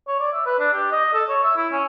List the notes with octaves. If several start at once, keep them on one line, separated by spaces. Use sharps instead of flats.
C#5
D5
E5
B4
D4
G4
D#5
A4
C#5
E5
E4
C#4